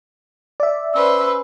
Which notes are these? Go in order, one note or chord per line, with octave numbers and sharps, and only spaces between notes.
D5 E5
C#4 B4 C5 E6